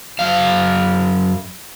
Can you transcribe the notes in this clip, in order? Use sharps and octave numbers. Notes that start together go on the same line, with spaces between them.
F#2 F5